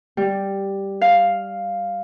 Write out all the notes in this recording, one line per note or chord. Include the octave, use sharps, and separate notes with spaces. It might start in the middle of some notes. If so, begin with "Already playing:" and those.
G3
F5